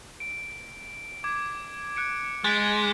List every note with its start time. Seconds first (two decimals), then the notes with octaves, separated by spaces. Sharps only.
0.20 D7
1.24 D6 G#6
1.96 F#6 C#7 D7
2.44 G#3 A6 B6 D7